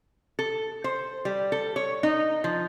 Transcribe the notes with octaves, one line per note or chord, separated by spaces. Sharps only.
A4
C5
G3
A4
C#5
D#4
F3